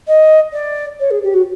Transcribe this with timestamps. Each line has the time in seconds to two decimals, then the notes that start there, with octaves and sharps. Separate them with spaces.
0.07 D#5
0.53 D5
1.00 C#5
1.10 G#4
1.23 G4
1.34 F#4